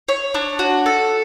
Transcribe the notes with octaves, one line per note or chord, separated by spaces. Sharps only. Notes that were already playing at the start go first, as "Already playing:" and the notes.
C#5
D4
F#4
A4